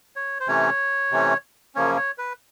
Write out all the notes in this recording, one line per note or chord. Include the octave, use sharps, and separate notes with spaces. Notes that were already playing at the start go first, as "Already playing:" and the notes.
C#5
C5
C3 E3 A3 C#4 C#5
C3 E3 A3 C#4
F#2 C#3 F3 A#3 C#4 C#5
C#5
B4